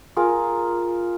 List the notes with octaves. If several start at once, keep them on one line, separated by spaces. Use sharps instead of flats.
F4 G#4 A#4